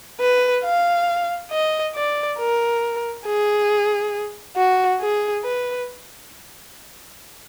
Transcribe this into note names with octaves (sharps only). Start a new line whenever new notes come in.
B4
F5
D#5
D5
A#4
G#4
F#4
G#4
B4